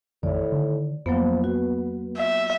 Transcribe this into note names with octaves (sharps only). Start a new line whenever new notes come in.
A1 F2 A2 D#3 D5
D3 D#3
F2 F3 F#3 A#3 B3
B3 F#4
E5